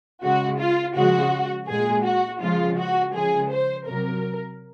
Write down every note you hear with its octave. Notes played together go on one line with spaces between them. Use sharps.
C#3 G#3 F#4
F4
C#3 F3 G#3 F#4
A#2 G#3 G#4
F#4
C#3 F3 G#3 F4
F#4
C#3 F3 G#3 G#4
C5
C3 F#3 A#4